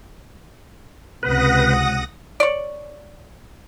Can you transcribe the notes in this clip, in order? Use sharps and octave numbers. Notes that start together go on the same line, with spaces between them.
C#2 C3 B4 F#5 D#6 A#6
C#5 D5